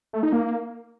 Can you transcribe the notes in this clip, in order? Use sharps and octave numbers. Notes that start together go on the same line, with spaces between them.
A3
D#4
A#3